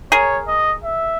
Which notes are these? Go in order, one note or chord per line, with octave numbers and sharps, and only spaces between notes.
G#4 A#4 C#5
D#5
E5